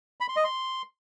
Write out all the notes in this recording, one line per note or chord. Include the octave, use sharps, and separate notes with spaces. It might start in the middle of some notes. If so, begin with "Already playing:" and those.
B5
C6
D#5
C6